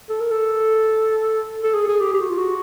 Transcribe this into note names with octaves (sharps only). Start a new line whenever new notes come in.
A4
A#4
A4
A4
G#4
G#4
G4
G4
F#4
F4
F#4